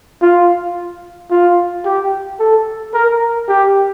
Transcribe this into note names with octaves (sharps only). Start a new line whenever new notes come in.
F4
F4
G4
A4
A#4
G4